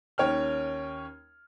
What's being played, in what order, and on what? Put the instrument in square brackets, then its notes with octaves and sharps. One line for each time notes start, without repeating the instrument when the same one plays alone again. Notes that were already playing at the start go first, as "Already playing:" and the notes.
[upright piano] D#2 C#4 C#5 G5 F6